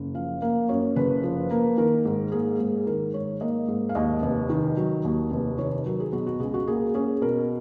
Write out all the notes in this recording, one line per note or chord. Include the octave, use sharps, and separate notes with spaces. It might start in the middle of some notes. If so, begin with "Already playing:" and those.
Already playing: F#1
F3 F5
A#3 F5
F#2 C#5
F#1 B4
F3
A#3
D#3 A#4
G#2
A#3 G#4
G#2 G#4
D#3 A#4
G#2 C#5
A#3 D#5
G#2
F5
D#2 D#5
F1 D#5
D#3
F#3
D#2
F1
D#3 C#5
F#3 A#4
G#4
B2 F#4
F#4
C#2 G#4
F#4
A#3 G#4
C#4 G#4
B2 A#4